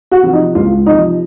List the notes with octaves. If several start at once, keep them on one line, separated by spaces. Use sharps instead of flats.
F#4
C3 F3
D#4
C#2 F4
C3 F3 D#4